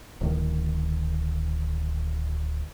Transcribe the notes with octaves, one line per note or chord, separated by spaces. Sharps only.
D1 D#3